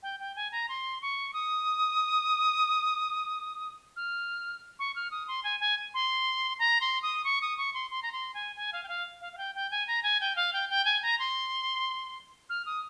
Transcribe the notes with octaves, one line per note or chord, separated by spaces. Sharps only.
G5
G5
G#5
A#5
C6
C#6
D#6
F6
C#6
F6
D#6
C6
G#5
G#5
C6
A#5
C6
D#6
C#6
D#6
C#6
C6
C6
A#5
C6
G#5
G#5
F5
G5
F5
F5
F5
G5
G5
G#5
A#5
G#5
G5
F5
G5
G5
G#5
A#5
C6
F6
D#6